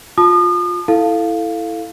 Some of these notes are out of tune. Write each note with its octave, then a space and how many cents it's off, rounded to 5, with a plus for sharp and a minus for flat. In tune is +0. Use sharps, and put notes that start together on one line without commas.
F4 +20 A5 -10 D#6 -40
E4 +0 A4 +0 F5 +0